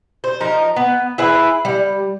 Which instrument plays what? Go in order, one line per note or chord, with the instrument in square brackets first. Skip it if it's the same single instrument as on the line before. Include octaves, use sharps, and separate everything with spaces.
[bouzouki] C5
F3 D#4 A#4
B3
E4 G#4 B4
G3